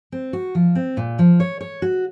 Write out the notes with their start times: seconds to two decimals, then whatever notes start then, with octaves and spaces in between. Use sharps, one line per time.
0.12 C4
0.33 F#4
0.55 F3
0.75 C4
0.97 A#2
1.19 F3
1.40 C#5
1.61 C#5
1.82 F#4